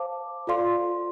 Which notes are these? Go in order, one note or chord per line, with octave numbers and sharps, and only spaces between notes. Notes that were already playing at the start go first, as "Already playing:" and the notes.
Already playing: C5 F5 A5 D6
F4 A4 D5 F5 C6